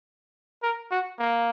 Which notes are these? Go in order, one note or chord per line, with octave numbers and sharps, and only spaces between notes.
A#4
F#4
A#3